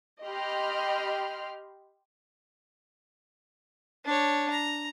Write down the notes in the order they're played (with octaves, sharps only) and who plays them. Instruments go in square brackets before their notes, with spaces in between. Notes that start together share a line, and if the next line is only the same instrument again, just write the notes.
[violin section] G4 D#5 B5 C6 F6
[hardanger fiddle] D4 C#5
A#5